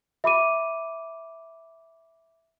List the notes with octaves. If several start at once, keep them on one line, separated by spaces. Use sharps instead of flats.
E5 B5 D6 D#7